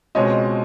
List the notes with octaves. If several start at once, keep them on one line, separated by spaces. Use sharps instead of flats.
C#2 B2 G#3 C4 C#5 D#5